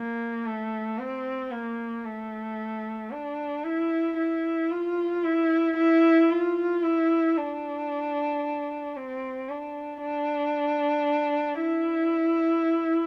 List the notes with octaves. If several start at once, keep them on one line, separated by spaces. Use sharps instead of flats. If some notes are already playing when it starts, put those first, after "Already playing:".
Already playing: A#3
A3
C4
A#3
A3
D4
E4
E4
F4
E4
E4
F4
E4
D4
C4
D4
D4
E4